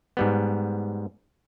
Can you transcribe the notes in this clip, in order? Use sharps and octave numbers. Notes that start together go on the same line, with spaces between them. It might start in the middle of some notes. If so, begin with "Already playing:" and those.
G#2 G3 B3